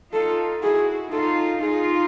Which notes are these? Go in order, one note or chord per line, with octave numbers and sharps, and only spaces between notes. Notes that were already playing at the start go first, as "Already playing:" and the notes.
D#4 F4 A4
E4 F#4 G#4
D#4 F4 A4
D#4 F4 G#4